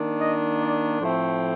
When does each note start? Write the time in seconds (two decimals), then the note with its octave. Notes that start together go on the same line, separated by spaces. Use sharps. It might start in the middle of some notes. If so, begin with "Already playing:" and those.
Already playing: D#3 A#3 D4
0.21 D#5
0.62 D5
1.01 A2 F3 A3 C4 C5